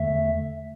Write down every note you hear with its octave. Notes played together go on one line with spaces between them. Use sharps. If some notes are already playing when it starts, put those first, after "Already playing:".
Already playing: E2 D3 A3 E5